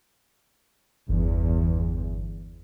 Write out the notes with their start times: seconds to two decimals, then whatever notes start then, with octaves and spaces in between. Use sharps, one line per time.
1.09 G1 E2